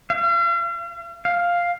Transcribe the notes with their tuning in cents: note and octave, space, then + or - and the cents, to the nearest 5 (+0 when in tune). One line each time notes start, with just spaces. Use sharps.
F5 -40
F5 +0